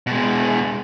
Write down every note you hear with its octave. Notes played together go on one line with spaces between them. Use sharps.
B2 G#3